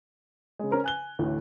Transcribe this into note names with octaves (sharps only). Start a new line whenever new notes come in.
C#3 G#3
C#4 A#4 C5
G#5 F#6 G7
A1 D2 A2